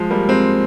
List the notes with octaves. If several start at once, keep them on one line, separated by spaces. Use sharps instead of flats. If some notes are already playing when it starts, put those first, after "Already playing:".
Already playing: F3 G#3
G3 A#3
G#3 C4